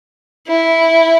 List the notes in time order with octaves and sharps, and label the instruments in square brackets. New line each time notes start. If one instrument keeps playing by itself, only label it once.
[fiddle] E4